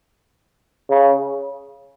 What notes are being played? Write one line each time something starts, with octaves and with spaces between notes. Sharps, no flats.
C#3